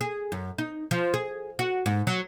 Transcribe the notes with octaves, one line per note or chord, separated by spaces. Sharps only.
G#4
F#2
D#4
F3
G#4
F#4
G#2
F#3